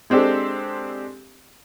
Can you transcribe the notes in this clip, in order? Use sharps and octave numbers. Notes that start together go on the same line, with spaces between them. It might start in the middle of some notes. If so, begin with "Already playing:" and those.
G#3 C4 D4 G4 A4